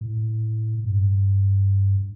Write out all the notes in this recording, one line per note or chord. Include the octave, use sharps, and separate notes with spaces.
A2
G2